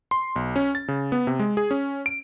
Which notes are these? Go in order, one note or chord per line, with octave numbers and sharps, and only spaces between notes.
C6
B1
C#4
A6
C#3
B3
C3
G#3
G#4
C#4
D7